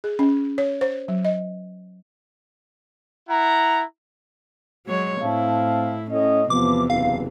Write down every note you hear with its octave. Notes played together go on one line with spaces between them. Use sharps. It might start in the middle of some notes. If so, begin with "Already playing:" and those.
G#4
C#4
C#5
C5
F#3
D#5
E4 F#5 A#5
F#3 G#3 C#5
A2 C4 E4 F5 A5
A2 C#4 D#5
E2 C3 F3 B3 D6
F#1 F5